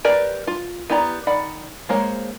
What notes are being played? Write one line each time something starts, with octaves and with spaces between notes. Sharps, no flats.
G4 A#4 B4 D5
F4
B3 E4 G4 D5 A#5
D#3 D5 F#5 B5
G#3 A#3 C5 C#5